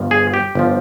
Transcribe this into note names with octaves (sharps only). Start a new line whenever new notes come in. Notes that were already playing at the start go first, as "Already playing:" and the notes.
Already playing: G1 G2 F3
G#4
G4
G1 F3